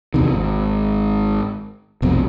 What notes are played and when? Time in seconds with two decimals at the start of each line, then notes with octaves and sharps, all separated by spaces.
0.14 F1 E2 C3 D#3
0.33 G#1
2.02 F1 B1 C4